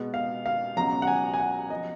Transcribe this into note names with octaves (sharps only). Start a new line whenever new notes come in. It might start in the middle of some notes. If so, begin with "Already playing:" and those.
Already playing: B2 G#3 B3
F5
F5
C#2 B2 F#3 A#5
F#5
G#5
G#5
F#5
F3 B3 D#5